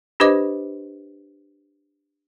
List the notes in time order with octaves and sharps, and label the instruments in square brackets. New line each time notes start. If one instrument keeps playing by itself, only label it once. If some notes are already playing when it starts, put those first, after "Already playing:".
[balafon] D4 G4 B4 C5 D#5 D6